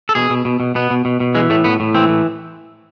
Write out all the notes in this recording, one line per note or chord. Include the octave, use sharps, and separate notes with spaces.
A4
B2 G#4
B2
B2
B2
B2 B3
B2
B2
B2
E3 G#3
A2 A3
A2 B3
A2
E3 C4
A2